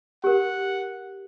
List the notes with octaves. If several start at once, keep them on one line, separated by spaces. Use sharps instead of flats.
G4 A#4 F#5